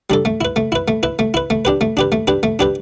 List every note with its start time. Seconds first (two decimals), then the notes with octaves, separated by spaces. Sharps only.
0.10 G3 D4 A4
0.25 A3
0.41 E4 B4
0.56 A3
0.72 E4 B4
0.88 A3
1.03 E4 B4
1.19 A3
1.34 E4 B4
1.50 A3
1.65 D4 G4 B4
1.81 A3
1.97 D4 G4 B4
2.12 A3
2.27 D4 G4 B4
2.43 A3
2.59 D4 G4 B4